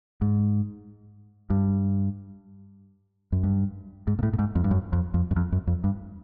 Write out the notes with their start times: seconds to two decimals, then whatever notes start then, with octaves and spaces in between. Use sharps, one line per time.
0.21 G#2
1.50 G2
3.32 F#2
3.44 G2
4.07 G#2
4.19 A#2
4.23 A2
4.33 A2
4.39 G#2
4.55 F2
4.64 G2
4.71 F#2
4.93 F2
5.14 F2
5.31 F#2
5.36 F2
5.52 F#2
5.67 F2
5.84 G2